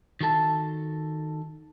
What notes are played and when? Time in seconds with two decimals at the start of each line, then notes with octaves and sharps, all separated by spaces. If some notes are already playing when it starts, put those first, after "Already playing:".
0.21 D#3 F#4 A4 A5